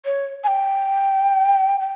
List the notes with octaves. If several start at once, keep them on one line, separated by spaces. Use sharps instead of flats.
C#5
G#5
G5
G5